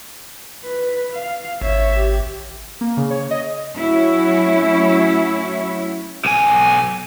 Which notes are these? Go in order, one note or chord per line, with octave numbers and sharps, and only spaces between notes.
B4
F5
G#1 C#5 E5
G4
A#3
C#3
C#5
D#5
F#3 A3 C#4 E4 F#4 C#5
B1 G#5